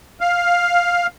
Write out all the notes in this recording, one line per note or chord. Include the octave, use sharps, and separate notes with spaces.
F5